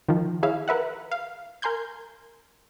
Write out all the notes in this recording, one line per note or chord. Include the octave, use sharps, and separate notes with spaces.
D#3 F3
E4 G#4 C#5 E5 F5
A#4 B4 E5 F#5
F5
A#4 G#5 C6 G6 G#6